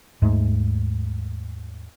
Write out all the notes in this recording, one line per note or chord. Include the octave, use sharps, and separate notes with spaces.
D#2 G#2 G#3 A3